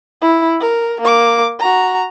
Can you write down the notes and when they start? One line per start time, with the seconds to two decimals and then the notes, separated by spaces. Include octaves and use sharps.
0.22 E4
0.60 A#4
1.01 A#3 D6
1.60 F#4 A#5